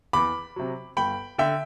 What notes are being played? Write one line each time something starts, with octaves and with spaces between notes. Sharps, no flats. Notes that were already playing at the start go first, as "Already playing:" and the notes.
E2 B5 D6
C3 F#3
G1 G5 B5
D3 E5 G5